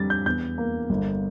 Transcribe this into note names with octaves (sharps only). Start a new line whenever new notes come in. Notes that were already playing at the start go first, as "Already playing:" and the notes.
Already playing: F2 D3 G3 A6
G6
E2 G6
A#3
G1